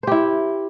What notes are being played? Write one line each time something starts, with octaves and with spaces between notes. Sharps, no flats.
E4 G4 C5